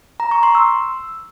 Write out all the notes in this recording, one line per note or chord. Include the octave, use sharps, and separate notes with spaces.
A#5
C#6
C6
E6